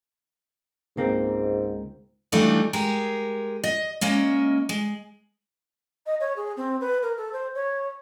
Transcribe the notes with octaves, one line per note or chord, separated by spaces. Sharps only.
C#2 G#2 A#3 C4
E3 G3 A3 D4 D#4 F4
G#3 G4 G#4 A#4
D#5
G#3 A#3 C#4 D#5 E5
G#3
D#5
C#5
G#4
C4
B4
A#4
A4
C5
C#5